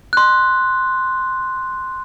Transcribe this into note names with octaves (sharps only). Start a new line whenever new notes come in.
C6 F#6